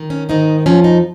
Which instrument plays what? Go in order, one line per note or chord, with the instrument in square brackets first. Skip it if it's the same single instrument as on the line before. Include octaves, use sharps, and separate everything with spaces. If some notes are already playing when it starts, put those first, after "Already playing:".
Already playing: [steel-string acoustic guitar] D#3
C#4
G#2 D#3 D#4
F2 F3 C#4
D#4